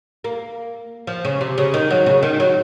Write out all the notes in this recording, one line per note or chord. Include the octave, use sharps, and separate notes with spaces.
A#3
F3
C#3
C3
C#3
D#3
F#3
C#3
D#3
F#3